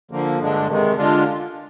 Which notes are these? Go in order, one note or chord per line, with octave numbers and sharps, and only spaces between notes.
D3 F3 A#3
G2 D3 G#3 D4
C3 D#3 G#3
D3 G#3 D4 F4